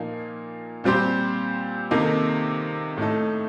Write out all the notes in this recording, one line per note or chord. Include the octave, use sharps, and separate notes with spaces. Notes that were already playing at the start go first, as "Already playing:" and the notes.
Already playing: A#2 F3 A#3 D#4
A#2 G3 C4 G4 C5
C3 D#3 A#3 D#4 A4
A2 A3 D#4 A4